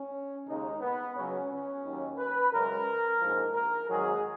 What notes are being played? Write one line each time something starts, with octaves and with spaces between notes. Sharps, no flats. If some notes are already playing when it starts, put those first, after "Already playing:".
Already playing: C#4
D#2 C#3 G#3 D#4
B3
C#2 C#3 F#3 C#4
C#4
D#2 D#3 F#3
B4
F#2 C#3 G#3 A#4
A#1 G#2 F3
A#4
G#1 G#2 D#3 F#3 G#4